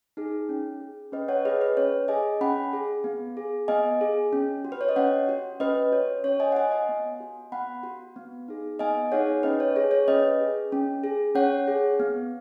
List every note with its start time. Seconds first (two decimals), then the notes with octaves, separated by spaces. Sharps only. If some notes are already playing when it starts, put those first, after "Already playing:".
0.17 D#4 G#4
0.49 C#4
0.81 G#4
1.12 C#4 B4 D#5
1.28 C#5 F#5
1.45 G#4 B4 D#5
1.61 B4
1.77 C#4 C#5
2.08 G#4 D#5 G#5
2.41 C#4 F#5 B5
2.73 G#4
3.04 B3
3.37 G#4
3.68 B3 D#5 G#5
4.01 G#4
4.33 C#4
4.65 F#4
4.72 B4
4.81 C#5
4.89 D#5
4.96 C#4 C#5 F#5
5.29 F#4
5.60 C#4 B4 D#5
5.92 F#4 C#5
6.24 C#4 C#5
6.40 D#5 G#5
6.52 F#5
6.56 F#4 D#5 G#5
6.72 D#5 G#5
6.89 B3
7.20 F#4
7.52 B3 F#5 B5
7.83 F#4
8.16 B3
8.48 D#4 G#4
8.79 B3 D#5 G#5
9.12 D#4 G#4 C#5 F#5
9.43 C#4 B4 D#5
9.60 C#5
9.76 G#4 C#5
9.91 C#5
10.08 C#4 B4 D#5
10.40 G#4
10.72 C#4
11.04 G#4
11.35 C#4 C#5 F#5
11.68 G#4
12.00 B3